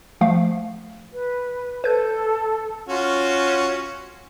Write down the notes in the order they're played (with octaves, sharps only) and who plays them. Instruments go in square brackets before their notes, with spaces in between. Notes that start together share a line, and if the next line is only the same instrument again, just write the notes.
[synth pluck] F3 A3 F5
[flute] B4
[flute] A4 [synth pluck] B4 G6
[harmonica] C#4 F4 F#4